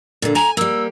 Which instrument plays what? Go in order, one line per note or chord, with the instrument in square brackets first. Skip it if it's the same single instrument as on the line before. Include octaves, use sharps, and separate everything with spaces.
[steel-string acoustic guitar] A#2 D3
[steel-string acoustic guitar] G#5 [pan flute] A#5
[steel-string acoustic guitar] G3 A#3 [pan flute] E6